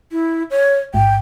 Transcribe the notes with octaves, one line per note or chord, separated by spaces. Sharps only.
E4
C#5
A1 G#2 G5